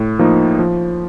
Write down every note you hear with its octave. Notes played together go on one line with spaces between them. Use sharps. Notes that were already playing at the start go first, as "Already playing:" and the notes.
Already playing: A2
F3 A#3 D#4
F3